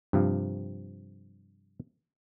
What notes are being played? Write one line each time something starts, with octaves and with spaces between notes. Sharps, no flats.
G2 C3 F3